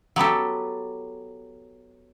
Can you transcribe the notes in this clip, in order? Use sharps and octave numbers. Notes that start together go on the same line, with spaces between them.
F#3 B3 G4 A4